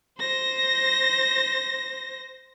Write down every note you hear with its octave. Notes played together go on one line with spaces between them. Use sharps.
C5 A#6